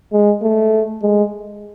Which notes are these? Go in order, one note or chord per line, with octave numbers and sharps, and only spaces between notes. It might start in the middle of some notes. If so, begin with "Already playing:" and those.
G#3
A3
G#3